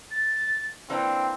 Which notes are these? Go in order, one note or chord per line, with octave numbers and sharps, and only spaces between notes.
A6
E3 A#3 C4 D4 G5